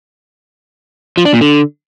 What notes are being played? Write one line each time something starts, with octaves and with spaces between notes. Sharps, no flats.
F3
D4
A#2
D3